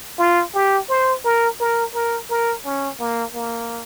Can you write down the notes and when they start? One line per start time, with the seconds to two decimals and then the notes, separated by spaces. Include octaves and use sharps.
0.19 F4
0.54 G4
0.89 C5
1.24 A#4
1.60 A#4
1.94 A#4
2.30 A#4
2.65 C#4
3.00 A#3
3.34 A#3